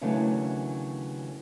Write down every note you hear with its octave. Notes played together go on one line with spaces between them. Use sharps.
D#2 C#3 E3 F#3 A3 D4